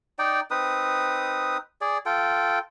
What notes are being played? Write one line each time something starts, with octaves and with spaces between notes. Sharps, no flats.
D#4 D5 G5
C4 D#4 B4 D#6
G#4 D5
F4 A4 G5